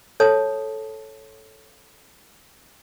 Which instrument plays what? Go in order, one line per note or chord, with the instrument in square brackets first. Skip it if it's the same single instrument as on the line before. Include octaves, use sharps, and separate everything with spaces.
[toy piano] A4 C#5 A5 D#6